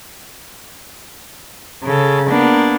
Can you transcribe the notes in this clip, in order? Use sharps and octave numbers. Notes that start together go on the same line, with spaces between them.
C#3 A4
A#3 B3 D4